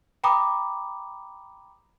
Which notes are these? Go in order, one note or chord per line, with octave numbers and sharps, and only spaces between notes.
G5 A#5 B5 D6 D#6